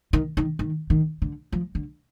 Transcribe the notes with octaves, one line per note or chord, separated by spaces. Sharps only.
D#3
D#3
D#3
D#3
D3
F3
D3